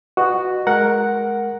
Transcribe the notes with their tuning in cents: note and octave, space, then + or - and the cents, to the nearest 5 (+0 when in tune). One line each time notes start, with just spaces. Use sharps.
F#4 +0 B4 +0 D#5 -30
G#3 +20 A#4 +0 F#5 +0